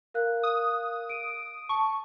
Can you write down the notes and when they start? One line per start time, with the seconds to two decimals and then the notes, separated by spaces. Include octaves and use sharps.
0.14 A#4 F5 F#6
0.43 D#6
1.09 D7 D#7
1.69 A5 C#6